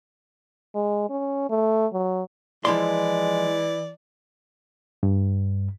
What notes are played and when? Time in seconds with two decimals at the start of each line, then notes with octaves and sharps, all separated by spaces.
0.75 G#3
1.10 C#4
1.50 A3
1.93 F#3
2.65 E3 F3 G#3 E4 D5 C6
5.03 G2